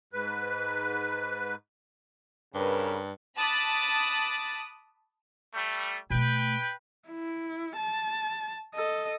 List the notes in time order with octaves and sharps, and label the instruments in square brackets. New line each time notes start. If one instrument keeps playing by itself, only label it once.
[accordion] G#2 B4
[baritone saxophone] G2 [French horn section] C#3 A#4 B4
[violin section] A5 B5 D6 D#6 F#6 A6
[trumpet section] G3 A3
[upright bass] B2 A3 [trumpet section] B4 G5
[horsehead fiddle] E4
A5
A4 D#5